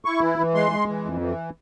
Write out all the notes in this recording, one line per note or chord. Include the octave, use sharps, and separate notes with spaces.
E4 C#6
E3
E3
G#3 C6
G#3
E3
F2
E3